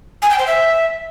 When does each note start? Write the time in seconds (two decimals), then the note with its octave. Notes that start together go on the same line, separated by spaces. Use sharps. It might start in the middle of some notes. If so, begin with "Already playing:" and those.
0.22 G#5
0.30 G5
0.38 C5
0.46 E5